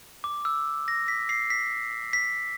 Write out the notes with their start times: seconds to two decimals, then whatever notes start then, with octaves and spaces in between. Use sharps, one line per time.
0.24 D6
0.45 E6
0.88 A#6
1.08 B6
1.29 C7
1.50 B6
2.13 B6